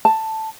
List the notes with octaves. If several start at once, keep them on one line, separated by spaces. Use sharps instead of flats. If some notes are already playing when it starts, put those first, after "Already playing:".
A5